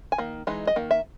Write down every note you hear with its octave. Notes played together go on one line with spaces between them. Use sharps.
G#5
D#3 A#3
E3 G#3 D#4
D#5
D#3 A#3
E5